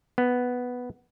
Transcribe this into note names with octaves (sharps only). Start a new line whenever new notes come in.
B3